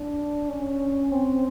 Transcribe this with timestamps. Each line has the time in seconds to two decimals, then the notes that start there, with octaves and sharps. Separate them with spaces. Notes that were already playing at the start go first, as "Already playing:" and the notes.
Already playing: D4
0.49 C#4
1.12 C4